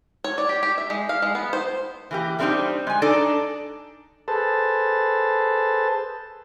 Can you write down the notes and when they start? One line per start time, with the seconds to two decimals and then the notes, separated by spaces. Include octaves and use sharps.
0.24 C#5
0.38 D5
0.49 G4
0.63 G4
0.78 E5
0.90 G#3
1.09 F5
1.22 G#3
1.35 B3
1.53 C5
2.11 E3 A#3 G4
2.38 G3 A3 C4 D4 D#4 G4
2.87 G#3 G#5
3.02 D4 D#4 A4 D5
4.28 G#4 A4 B4 C5 A5